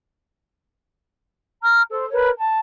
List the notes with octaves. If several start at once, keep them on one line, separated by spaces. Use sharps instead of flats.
A#5 F6
A4 C5
A#4 B4 C#5
A5